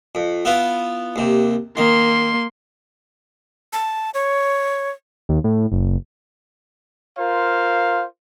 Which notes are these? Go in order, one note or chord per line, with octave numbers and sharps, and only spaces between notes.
F2
B3 E4 F4
D#2 C3
D#3 A#3 C6
A5
C#5
D#2
A2
F#1
F4 A#4 C5 F5